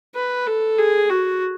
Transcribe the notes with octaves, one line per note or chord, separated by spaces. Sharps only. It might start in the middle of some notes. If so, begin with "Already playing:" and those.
B4
A4
G#4
F#4